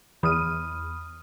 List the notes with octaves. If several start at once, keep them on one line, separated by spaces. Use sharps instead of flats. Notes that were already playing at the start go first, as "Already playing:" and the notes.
E2 B5 D#6 F6 D#7